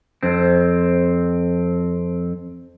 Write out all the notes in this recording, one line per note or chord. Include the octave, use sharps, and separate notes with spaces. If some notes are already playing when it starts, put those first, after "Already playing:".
F2 C4